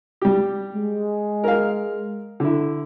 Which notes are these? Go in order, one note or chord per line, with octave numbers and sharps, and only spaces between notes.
G3 G4
G#3
A#4 F5
D3 E4